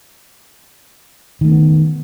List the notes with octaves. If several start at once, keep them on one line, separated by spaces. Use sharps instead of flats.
D#3 A3 B3 C4